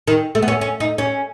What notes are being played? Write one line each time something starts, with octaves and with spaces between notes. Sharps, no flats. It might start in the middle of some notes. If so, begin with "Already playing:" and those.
D#3
A3
B3
C#4
C#4
D#4
C#4